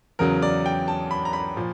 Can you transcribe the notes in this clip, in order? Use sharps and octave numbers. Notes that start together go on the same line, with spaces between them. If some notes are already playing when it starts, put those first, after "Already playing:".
E2 C#3 F#3 A#4
D5
G5
A5
B5
A#5
B5
A#2 F3